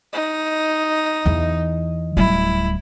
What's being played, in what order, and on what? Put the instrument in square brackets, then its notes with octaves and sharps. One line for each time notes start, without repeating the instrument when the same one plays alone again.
[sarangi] D#4
[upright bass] E2 E3
[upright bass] D1 G3 [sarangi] E4